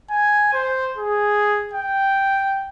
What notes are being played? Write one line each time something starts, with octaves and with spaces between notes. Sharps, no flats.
G#5
C5
G#4
G5